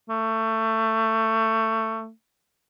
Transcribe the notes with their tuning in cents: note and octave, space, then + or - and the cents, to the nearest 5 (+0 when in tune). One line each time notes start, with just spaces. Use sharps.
A3 +20